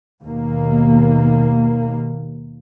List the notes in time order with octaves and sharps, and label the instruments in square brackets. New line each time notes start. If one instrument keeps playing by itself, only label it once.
[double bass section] D#2 B2 A#3